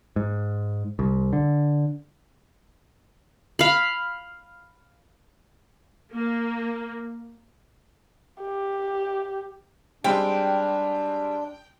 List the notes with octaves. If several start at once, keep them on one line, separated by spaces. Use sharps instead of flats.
G#2
C2
D3
F5 B5
A#3
G4
G3 G#3 C4 D4 G5